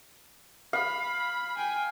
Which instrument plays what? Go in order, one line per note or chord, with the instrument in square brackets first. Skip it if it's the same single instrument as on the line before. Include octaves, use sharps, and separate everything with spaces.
[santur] F5 [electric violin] B5
[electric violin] G5 G#5